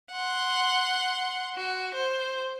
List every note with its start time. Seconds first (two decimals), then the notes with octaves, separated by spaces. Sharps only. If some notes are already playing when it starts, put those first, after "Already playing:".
0.12 F#5 C6
1.56 F#4
1.95 C5